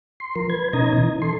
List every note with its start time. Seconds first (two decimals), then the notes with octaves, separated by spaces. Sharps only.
0.20 C6
0.36 F3 A#4
0.50 B4 G#6
0.73 B2 C#4 D#4 D#5 A#5 G#6
0.97 E3
1.22 A4 C6